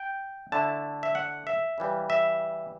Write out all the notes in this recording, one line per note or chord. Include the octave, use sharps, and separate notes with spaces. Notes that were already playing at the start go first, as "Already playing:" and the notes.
Already playing: G5
D3 A3 E4 A5
E5
F#5
E5
C#3 E3 G3
E5